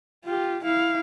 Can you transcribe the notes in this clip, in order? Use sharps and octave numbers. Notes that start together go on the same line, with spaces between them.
F4 G4
E4 F5